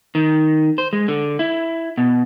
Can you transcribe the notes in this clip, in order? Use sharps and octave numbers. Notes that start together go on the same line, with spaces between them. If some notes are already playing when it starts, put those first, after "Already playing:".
D#3
C5
G#3
D3
E4
B2